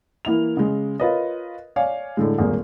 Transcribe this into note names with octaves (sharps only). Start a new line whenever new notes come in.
E3 A#3 E4 F7
C#3 G#3
F4 A#4 B4 C#5 D#5
C#5 D5 F5 G#5
A2 D3 G#3
D#1 G#1 A#3 G#4